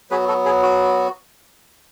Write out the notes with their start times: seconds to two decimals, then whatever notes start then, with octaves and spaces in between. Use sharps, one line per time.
0.10 F#3 B3 F#4 G#4 B4
0.28 F#4 A4
0.45 G#4
0.63 F#4